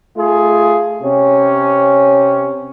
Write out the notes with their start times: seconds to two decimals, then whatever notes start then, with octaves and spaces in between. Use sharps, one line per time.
0.16 A3 F4 G#4
1.02 C3 C#4